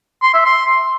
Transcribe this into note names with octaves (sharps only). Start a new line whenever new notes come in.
C6
E5
C6